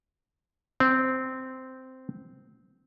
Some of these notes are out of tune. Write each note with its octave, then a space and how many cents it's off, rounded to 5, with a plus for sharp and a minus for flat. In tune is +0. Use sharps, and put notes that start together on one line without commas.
C4 -10